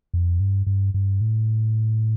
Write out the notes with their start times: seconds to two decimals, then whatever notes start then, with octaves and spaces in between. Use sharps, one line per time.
0.14 F2
0.40 G2
0.67 G2
0.94 G2
1.21 A2